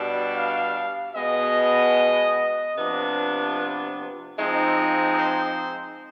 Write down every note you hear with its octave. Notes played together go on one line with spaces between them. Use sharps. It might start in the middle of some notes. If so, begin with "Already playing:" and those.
Already playing: B2 G3 D4
F5
B2 G#3 B3 D#5
C3 F3 B3 D4
F3 G#3 C4 D#4
C5